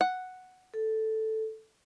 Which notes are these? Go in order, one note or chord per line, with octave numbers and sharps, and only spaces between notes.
F#5
A4